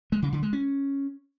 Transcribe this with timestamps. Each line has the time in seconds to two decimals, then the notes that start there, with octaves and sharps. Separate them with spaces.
0.12 G#3
0.22 C#3
0.33 D3
0.43 G#3
0.53 C#4